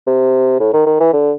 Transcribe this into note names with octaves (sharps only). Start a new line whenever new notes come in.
C3
A2
D#3
D#3
E3
D3